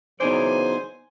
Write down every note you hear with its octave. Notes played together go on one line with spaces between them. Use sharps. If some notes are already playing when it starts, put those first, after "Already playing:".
C#3 E3 F#3 B3 D#4 C5 D5 G#5